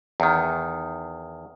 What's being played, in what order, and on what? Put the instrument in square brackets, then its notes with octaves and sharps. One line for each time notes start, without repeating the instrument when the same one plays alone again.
[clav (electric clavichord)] E2 D#3